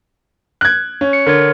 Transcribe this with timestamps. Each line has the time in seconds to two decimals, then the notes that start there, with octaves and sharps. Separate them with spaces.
0.61 F#6 G#6
1.01 C#4
1.13 C#7
1.27 D3 A#4 C#5